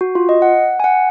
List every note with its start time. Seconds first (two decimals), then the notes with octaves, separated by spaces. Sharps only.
0.01 F#4
0.15 F4
0.29 D#5
0.42 F#5
0.80 G#5
0.84 F#5